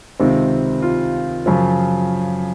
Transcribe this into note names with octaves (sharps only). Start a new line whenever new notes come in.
C#2 C3 D#3 C4
F4
F#2 C#3 F3